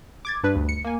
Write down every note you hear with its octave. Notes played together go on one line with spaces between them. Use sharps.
D6 G#6 A6
G2 D4 B4
D2
C#7
A#3 G#5